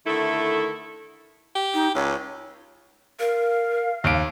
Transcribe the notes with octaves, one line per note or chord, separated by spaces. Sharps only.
D3 D#3 A3 E4 A4
G4
D#4
C#2 C#5
A#4 F5
D#2 D7